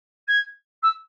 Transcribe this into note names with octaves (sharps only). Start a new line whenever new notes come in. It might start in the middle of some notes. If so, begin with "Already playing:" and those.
G#6
E6